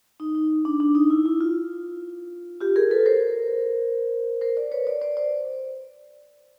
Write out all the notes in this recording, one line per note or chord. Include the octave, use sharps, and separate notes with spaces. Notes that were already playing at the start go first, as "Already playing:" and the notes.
D#4
D#4
D4
D4
D#4
E4
E4
F4
F4 G4
G#4 A#4
A4 B4
A#4 C5
A#4 C5
C5 D5
B4 C#5
C5 D5
C5 D5
C5 D5